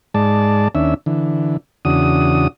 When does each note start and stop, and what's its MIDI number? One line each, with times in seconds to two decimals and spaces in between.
0.15 0.68 44
0.15 0.68 56
0.15 0.68 74
0.15 0.68 81
0.75 0.94 39
0.75 0.94 61
0.75 0.94 62
0.75 0.94 76
1.06 1.57 50
1.06 1.57 52
1.85 2.48 40
1.85 2.48 49
1.85 2.48 62
1.85 2.48 66
1.85 2.48 87